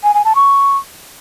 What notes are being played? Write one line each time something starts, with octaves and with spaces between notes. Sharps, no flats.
G#5
G#5
A5
C#6